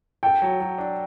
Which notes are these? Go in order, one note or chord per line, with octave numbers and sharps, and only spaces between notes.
A4 G5
F#3
F#3
D4